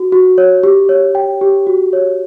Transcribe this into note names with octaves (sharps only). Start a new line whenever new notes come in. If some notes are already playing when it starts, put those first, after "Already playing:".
Already playing: F#4
F#4
C#5
G4
C#5
G5
G4
F#4
C#5